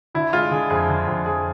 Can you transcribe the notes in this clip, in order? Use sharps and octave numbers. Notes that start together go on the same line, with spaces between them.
D3 E4
G#3 F4
D3 G#4
F2 G#4
D3
F2
F2 G#4